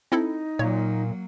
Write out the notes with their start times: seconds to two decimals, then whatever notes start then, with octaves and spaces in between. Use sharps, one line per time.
0.12 C4 D#4 E4 A4
0.59 A#2 F#3 A#3 C#5